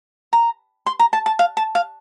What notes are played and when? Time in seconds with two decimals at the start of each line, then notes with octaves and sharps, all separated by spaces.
0.33 A#5
0.86 C6
0.99 A#5
1.13 A5
1.26 A5
1.39 F5
1.57 A5
1.75 F5